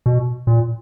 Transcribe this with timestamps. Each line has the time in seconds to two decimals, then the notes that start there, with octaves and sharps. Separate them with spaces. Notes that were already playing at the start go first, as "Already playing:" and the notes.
0.06 B2
0.47 A#2